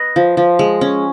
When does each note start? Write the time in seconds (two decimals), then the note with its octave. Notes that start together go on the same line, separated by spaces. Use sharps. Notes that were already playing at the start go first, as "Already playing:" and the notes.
Already playing: B4 D#5
0.16 F3
0.37 F3
0.59 G#3
0.81 C#4